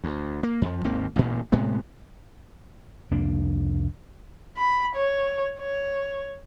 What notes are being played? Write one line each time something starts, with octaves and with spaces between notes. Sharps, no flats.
D2
A#3
F2 F3
G#1 D#2 A#3 C4
A1 D2 G2 A#2
A2 C3 G#3 B3
C2 F2 A#3 D4
B5
C#5
C#5